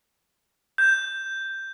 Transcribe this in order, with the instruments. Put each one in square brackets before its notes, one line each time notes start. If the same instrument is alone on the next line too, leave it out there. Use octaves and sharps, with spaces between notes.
[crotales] G6